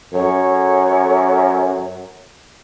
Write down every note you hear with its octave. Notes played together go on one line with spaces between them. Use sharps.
F#2 A4 C#5